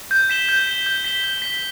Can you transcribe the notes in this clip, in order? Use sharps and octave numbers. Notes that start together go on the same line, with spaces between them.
G6
B6 E7 G7
G6
B6 E7 G7
G6
B6 E7 G7
G6
B6 E7 G7